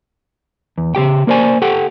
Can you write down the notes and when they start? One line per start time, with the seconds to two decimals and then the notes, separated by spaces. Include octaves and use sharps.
0.78 E2
0.95 C#3 F3 G4 G5
1.27 A#3 A#4 C5 D5 G#5
1.62 G4 A4 F#5 G5